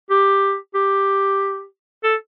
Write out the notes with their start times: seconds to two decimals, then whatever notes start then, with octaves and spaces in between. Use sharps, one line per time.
0.10 G4
0.74 G4
2.04 A4